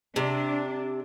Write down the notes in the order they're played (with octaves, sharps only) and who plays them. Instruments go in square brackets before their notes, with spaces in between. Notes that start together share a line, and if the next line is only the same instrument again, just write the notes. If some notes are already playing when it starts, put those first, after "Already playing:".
[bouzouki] C3 [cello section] D4